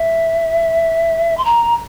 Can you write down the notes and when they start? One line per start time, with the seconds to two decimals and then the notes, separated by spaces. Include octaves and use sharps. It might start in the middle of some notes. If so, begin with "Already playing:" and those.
Already playing: E5
1.37 C6
1.45 A#5